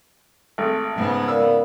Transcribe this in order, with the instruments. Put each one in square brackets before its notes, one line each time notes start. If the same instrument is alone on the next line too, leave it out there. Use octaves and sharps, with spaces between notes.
[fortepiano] G#1 A3
[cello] G#2 [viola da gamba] C#3 B3
[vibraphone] A#4 D5 F5 [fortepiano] E6